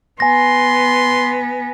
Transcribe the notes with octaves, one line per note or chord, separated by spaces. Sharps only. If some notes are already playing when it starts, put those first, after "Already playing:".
B3 G#5 C6 A#6